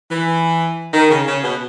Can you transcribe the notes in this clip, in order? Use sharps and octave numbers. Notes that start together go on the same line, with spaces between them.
E3
D#3
C#3
C#3
B2